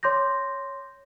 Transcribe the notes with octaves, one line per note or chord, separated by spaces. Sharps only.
C#5 C6 D6 G6 A#6